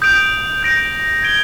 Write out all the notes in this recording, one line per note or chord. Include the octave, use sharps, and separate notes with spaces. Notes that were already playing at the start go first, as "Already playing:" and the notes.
D#6 G6 D7 F7
G6 A#6 D7
G#6 D7 G7